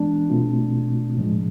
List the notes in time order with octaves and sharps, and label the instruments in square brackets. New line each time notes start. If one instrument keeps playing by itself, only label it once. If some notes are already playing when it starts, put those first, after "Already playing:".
Already playing: [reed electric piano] E3 G#3 B3 [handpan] D4
[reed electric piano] B2 A3 C4 F4
A2 F3 G#3